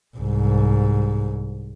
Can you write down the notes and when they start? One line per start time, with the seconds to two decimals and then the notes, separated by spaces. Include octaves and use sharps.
0.17 C2 G#2